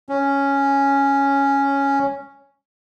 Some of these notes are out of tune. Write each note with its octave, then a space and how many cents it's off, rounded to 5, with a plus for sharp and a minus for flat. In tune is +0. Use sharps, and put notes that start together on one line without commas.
C#4 +0